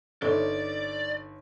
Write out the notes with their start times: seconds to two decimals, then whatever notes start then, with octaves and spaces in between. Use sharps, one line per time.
0.22 G1 D#4 A4 C#5 D5